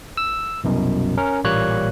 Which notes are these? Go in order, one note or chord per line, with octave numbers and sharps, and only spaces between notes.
E6
C2 F#2 B2
C#4 A#4
A1 A#2 G3 A#3 C#5 F#6